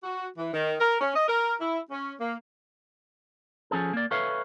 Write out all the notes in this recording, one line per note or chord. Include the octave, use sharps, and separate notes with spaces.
F#4
E3
D#3
A#4
C#4
D#5
A#4
E4
C#4
A#3
F3 C#4 G#4 A4
A#3 D5
A4 B4 C#5 E5 F5